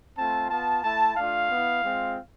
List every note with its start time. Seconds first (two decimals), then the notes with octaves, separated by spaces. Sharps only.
0.17 A3 C4 F4 A5
0.50 B3 F4 A5
0.84 A3 E4 A5
1.17 A3 D4 F4 F5
1.50 B3 E4
1.84 G#3 C4 F4